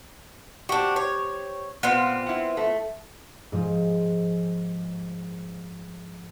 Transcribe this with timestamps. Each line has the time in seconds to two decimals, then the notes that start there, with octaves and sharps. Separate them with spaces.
0.69 C4 D4 F#4 G4
0.96 C#5
1.83 A#2 B3 C4 F4
2.26 E4 F#5
2.57 A3
3.52 G#2 F3